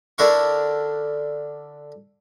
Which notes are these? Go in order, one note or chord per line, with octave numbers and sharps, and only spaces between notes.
D3 D4 E4 A#4 C#6